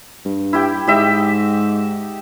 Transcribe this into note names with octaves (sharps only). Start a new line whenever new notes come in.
G2
E4 G4 G5
G#2 G4 D#5 E5